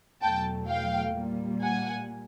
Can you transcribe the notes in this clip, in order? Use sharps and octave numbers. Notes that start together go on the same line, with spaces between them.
E2 B2 F#3 A3 G5 A5
F5 G5
A#2 G3 A#3
F#5 G#5